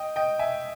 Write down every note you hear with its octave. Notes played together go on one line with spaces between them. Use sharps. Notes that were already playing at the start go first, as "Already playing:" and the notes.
Already playing: D#5 G5
D#5 G5
E5 G#5